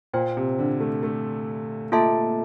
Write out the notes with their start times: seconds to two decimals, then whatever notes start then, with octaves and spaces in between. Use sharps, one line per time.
0.14 A#2 F4 C5 G5
0.37 C3
0.59 D3
0.80 A3
1.03 A3
1.92 A#3 F4 A4 E5 A5